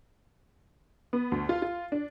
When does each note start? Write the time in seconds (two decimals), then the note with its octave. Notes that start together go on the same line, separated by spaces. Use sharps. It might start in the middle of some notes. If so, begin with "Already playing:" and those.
1.13 B3
1.32 D2
1.49 F4
1.62 F4
1.92 D4